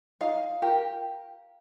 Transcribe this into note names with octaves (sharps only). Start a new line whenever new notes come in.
D#4 F5
G4 A#4